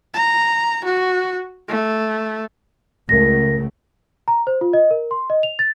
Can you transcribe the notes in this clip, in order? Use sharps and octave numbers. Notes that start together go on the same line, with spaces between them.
A#5
F#4
A3
C#2 C#3 A3 A#4 A#6
A#5
C5
F4
D#5
A#4
C6
D#5
F7
A6